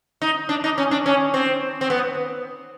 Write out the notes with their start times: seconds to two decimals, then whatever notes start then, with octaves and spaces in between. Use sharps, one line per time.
0.22 D#4
0.49 D4
0.64 D#4
0.78 C#4
0.91 D4
1.06 C#4
1.34 C4
1.81 C4
1.90 B3